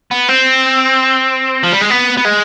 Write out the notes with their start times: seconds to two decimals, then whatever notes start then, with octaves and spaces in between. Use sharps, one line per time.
0.11 B3
0.29 C4
1.63 F3
1.72 G3
1.81 G#3
1.90 B3
2.18 B3
2.25 G#3